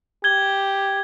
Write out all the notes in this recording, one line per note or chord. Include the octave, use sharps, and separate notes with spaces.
G4 G#6 G7